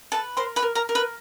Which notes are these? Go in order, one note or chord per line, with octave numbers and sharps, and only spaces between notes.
A4 B4 A5
A#4 C5 C6
B4 B5
A#4
A#4 A#5
A#4
B4 B5